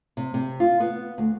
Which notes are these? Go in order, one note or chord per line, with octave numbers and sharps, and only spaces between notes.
C3
C3
F4
B3
D2